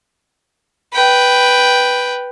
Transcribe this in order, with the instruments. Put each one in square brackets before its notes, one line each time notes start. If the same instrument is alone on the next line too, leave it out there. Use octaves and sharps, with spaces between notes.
[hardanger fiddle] B4 G5